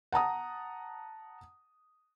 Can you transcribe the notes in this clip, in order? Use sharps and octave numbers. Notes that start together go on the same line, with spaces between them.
F#5 A5 A#5 D#6